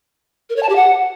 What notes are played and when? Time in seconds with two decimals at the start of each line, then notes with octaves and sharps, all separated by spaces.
0.50 A#4
0.56 C#5
0.63 A5
0.69 G4
0.76 F#5